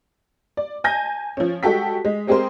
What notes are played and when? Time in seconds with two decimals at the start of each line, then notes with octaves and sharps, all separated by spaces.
0.57 D5
0.84 G#5 A5 G6 A#6
1.37 F3 C#4
1.63 G3 G#3 F#4 A4 G5 B6
2.05 G#3
2.27 G#3 C4 G4 G#4 A#4 C5